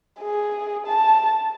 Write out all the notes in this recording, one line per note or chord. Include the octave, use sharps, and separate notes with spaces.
G#4
A5